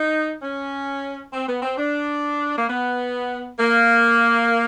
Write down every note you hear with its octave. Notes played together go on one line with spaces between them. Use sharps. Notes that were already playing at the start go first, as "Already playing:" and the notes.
Already playing: D#4
C#4
C4
B3
C4
D4
A#3
B3
A#3